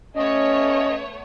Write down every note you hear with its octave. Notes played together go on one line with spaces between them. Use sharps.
A3 B3 C#4 C#5 D#5